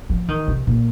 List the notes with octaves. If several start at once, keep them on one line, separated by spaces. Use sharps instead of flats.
F3
D#3
C3
A#2